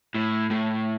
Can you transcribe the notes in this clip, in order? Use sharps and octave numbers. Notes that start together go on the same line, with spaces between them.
A2
A2